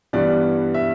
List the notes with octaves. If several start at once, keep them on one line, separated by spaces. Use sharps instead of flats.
G2 E3 G3 B3 D4 D5
E5